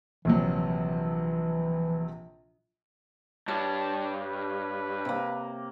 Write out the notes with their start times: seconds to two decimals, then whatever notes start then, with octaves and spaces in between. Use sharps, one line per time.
0.25 A#1 C3 E3 F#3
3.48 G2 G4 C#5 A5
4.22 B4
5.05 C3 A#3